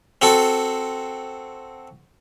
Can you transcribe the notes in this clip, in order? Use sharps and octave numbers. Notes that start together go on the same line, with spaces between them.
C4 F#4 A4